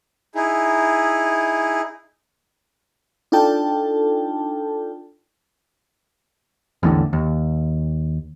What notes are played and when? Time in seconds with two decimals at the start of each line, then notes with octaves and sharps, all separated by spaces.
0.35 D#4 E4 G#4
3.32 D4 D#4 F4 A4 G5 A5
6.83 A1 E2 A2 D3
7.13 D#2